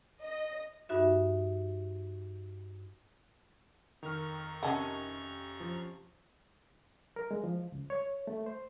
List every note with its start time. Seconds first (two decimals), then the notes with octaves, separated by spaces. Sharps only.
0.20 D#5
0.89 G2 D#4 F#4 E5
4.03 F2 D#3 A#5 C#6 F6
4.63 C3 C#4 D#5 F#5 A5
5.60 F3
7.16 A#4
7.31 G#3
7.44 F3
7.72 C#2
7.90 C#5
8.27 A3
8.46 C5